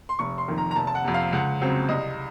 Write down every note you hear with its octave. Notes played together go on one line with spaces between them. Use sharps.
C6
F1 C#6
C6
F2 D#3 A#3
A#5
A#5
F1 A5
A5
F#5
F2 C3
F5
C#2 F#5
C#3 F#3 C4
C2 D#5